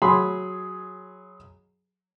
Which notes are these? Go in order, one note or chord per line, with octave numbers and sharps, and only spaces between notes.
F#3 G#4 B5 C6